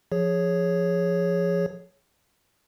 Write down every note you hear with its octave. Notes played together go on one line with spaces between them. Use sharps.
F3 G#4 C#5